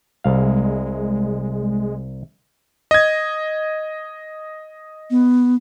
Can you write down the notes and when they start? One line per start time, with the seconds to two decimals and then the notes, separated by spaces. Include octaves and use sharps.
0.24 C2 G#3 F5
2.91 D#5 G#6
5.10 B3